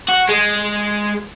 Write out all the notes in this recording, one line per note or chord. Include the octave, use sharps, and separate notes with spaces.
F#4
G#3